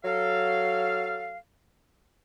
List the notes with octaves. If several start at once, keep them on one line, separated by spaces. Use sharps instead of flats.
F#3 A4 F5